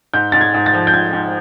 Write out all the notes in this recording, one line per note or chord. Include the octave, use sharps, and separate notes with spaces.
G#2 G6
G#2 A6
G#6
G#2
A6
F3
G6
G#2 G#6
G#2